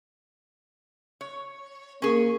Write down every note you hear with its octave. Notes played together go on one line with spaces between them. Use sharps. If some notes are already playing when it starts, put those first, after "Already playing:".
C#5
A#3 C#4 G#4